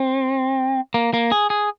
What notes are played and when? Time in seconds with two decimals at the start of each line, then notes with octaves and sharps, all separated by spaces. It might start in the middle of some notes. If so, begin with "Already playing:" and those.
Already playing: C4
0.94 A#3
1.14 A#3
1.32 G#4
1.50 G#4